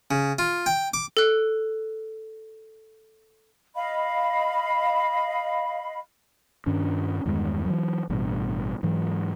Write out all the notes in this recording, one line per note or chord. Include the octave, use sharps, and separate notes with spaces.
C#3
F4
G5
D6
A4 F#6
D#5 F5 B5
G2 D#3 C#4 D4
E2 G2 D#3 G#3
E3 F#3
A1 G2 B2
G#2 E3 F#3